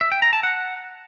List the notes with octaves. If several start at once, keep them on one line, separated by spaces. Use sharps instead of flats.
E5
G5
A#5
A5
F#5